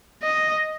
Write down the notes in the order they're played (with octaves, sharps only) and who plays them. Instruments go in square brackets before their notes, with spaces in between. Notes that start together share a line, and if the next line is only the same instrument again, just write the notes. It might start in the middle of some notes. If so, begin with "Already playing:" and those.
[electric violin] D#5